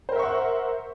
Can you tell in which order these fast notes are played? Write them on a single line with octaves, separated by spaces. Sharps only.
C5 A#4 E5 C#6 F#5